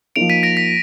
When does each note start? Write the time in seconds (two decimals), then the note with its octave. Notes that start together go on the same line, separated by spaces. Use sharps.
0.16 F3 A#3 D#4 A#4 D7 F7
0.30 B6 D#7
0.43 A#6 D7
0.57 B6